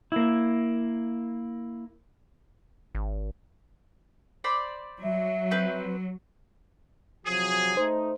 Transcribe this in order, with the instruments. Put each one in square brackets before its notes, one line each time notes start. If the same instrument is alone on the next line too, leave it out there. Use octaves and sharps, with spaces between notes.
[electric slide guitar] A#3 E4
[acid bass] G#1
[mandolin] C5 D5 B5
[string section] F#3 [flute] E5
[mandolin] C4 B4 G6
[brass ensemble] C3 F3 F#3 [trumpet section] G#4
[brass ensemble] A3 D#4 [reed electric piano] C5